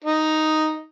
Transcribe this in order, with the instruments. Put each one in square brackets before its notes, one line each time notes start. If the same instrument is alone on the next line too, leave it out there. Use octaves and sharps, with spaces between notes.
[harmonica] D#4